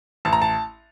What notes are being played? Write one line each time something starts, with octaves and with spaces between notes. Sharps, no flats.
A1 A5
A#5
A5